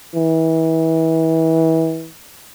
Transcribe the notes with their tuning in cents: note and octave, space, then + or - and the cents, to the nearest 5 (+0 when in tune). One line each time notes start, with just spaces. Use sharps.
E3 -30